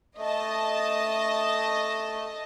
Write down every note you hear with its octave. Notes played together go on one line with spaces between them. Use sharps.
A3 D#5 A5